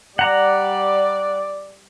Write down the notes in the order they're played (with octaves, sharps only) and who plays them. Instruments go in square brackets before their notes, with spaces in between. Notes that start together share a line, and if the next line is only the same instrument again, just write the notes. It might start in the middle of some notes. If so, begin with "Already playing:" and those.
[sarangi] G3 [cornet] D5 [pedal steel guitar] F#5 A#5